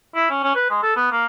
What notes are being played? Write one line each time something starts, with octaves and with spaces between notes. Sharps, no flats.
E4
C#4
C#4
B4
G#3
A4
B3
A#3